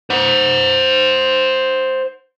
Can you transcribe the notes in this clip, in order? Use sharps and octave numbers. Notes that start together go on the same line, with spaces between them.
C5 F#5